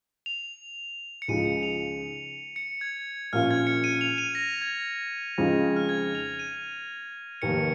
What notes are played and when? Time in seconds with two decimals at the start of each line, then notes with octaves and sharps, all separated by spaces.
0.26 F7
1.22 C#7
1.28 C#2 C#3 F3 G#3 D#4 D#7
1.45 C#7
1.63 F7
2.56 C#7
2.81 G#6
3.33 A#1 A#2 A#3 C#4 F4 F6
3.51 G#6
3.67 C#7
3.84 D#7
4.01 F7
4.18 D#7
4.35 A#6
4.61 G#6
5.38 F2 C#3 F3 G#3 D#4
5.76 F6
5.89 G#6
6.15 F7
6.39 D#7
7.42 F1 D#2 D#3 A#3 D#4 C#7